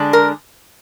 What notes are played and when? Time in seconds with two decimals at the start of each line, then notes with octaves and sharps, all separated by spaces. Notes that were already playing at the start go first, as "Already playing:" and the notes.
Already playing: D3 G#3 D4
0.13 A#4